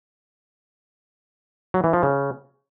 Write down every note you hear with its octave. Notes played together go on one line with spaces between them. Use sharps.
F#3
E3
F3
C#3